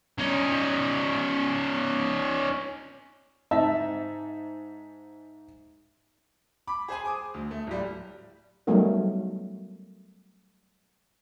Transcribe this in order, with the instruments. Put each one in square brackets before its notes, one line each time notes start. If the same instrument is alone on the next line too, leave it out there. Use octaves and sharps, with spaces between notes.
[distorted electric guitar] C#4 D#4
[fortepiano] G#2 E5 A5
[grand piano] B5 D6
G#4 C5 G#5
D6 D#6
D2
A3
D1 G3
[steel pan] F#3 G3 A3 B3 D#4 A#4